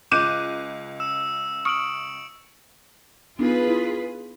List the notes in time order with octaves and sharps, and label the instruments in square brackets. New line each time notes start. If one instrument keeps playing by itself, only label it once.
[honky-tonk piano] C#2 F#6 D#7 [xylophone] D6 G6
[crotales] E6 E7
[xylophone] C#6 D#6 F6 [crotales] C#7 D7 F#7
[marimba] B3 D4 D#4 [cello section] F4 G#4 B4
[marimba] E4